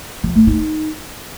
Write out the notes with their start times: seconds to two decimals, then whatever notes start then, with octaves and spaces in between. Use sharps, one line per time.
0.24 F3
0.35 A3
0.47 D#4